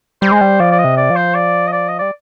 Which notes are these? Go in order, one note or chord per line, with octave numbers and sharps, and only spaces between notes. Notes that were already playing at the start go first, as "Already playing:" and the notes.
G3 C5
G#3
G3
F3 D5
D5
D#5
C3
D5
F3
C5
D5
D#5
D5
D#5
G3 D5